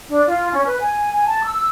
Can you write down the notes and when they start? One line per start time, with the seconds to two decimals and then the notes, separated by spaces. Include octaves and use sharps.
0.09 D4
0.27 F4
0.52 C#4
0.65 B4
0.80 G#5
1.13 G#5
1.26 A5
1.44 E6